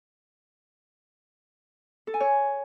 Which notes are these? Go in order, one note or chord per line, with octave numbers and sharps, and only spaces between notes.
A4
G#5
C#5